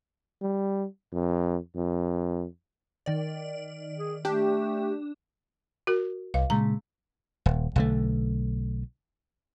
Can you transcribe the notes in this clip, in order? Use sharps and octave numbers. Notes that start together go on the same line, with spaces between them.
G3
F2
F2
D#3 D5
G#4
A3 D4 G4
F#4 A#4
C2 F5
A#2 C#3 G#3 A#5
D#1
B1 D3 A3